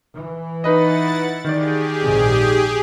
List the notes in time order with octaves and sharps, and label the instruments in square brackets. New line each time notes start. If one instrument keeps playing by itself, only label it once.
[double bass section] E3
[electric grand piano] D#4 B4 D#5 [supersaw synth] E4 F#5 A6
[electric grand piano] D#3 D5 [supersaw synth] G4 G#4
[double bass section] A#1 G#2 C3